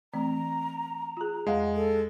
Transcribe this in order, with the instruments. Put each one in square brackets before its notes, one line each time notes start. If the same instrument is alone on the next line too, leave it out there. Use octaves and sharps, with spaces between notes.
[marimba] E3 A3 C4 [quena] A#5
[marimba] F4 G#4
[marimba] E2 F5 F#5 [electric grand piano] G#3
[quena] A4